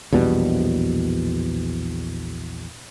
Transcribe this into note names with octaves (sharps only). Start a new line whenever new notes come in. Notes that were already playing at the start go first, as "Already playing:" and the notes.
A#1 E2 B2 G3